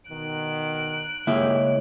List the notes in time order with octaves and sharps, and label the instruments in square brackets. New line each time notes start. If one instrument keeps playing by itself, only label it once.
[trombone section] B2 D#3 [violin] F#6 D7
[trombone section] G#1 G4 G#4 [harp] C#3 G#3 [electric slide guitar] A#3 E4 E5